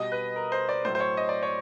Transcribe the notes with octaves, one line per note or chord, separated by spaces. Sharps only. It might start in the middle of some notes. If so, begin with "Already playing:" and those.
Already playing: B2 G3 D#5
B4
A#4
C5
D5
A2 F#3 C5
C5
C#5
D#5
D5
C#5